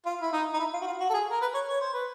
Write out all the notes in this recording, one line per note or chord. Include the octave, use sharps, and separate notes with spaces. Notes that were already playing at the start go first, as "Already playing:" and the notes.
F4
E4
D#4
D#4
E4
F4
F#4
F4
F#4
A4
G#4
A#4
B4
C#5
C#5
C5
B4